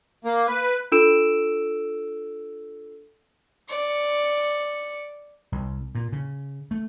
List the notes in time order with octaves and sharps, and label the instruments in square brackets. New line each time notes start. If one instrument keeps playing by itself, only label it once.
[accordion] A#3
B4
[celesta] D4 F4 A4 E6 D7 E7
[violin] D5 C#7
[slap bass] C2
A#2
C#3
A3